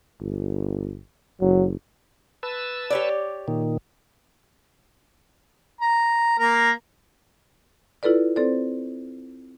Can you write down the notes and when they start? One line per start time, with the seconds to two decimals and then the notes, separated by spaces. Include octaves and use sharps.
0.20 G1
1.41 F#1 F#3
2.43 B4 A5 E6
2.90 G4 C#5 D5
3.48 A#2 D#3
5.81 A#5
6.39 A#3 A#4
8.03 E4 F4 A4 B4 D5
8.36 C4 A4 C5 D5